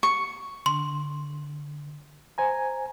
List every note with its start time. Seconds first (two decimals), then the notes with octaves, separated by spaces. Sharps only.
0.03 C#6
0.66 D3 C6
2.38 C5 G#5 A#5